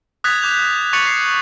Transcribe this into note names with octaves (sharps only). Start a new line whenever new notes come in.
D#6 F#6 G#6 A6 B6 F7
D6 G6 F7
C#6 F#6 A6 C#7 F7 F#7
C7